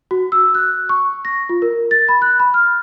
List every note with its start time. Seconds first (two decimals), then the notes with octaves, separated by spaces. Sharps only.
0.11 F#4
0.32 E6
0.55 F#6
0.89 C#6
1.25 A#6
1.49 F4
1.62 A#4
1.91 A6
2.09 B5
2.22 F#6
2.40 B5
2.54 F6